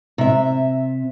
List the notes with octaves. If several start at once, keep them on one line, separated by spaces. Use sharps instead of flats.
C3 E5